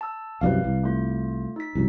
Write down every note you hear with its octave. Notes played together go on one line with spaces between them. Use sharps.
A5 E6
C2 F#2 C3 B4 D5 F5
C2
A3 F4
D#4 B6
C2 F#2